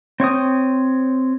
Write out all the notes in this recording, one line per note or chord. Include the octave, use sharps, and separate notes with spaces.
C4 C#5 G5 D#6